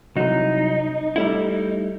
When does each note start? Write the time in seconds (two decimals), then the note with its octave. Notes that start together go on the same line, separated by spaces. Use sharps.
0.16 C2 F#3 D#4
1.16 G3 A3 E4